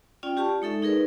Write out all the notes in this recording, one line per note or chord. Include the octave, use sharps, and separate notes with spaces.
C#4 F4 D5 G5
F4 G4 D5 A5 C#6
G#3 D#4 A4 E5
D#4 G#4 A#4 B4 D5